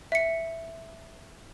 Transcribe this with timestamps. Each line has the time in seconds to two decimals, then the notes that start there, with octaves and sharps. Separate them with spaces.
0.12 E5 C#7